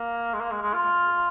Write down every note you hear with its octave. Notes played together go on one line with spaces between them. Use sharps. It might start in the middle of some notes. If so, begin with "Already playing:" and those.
Already playing: A#3
G#3
A#3
G#3
G#3
F4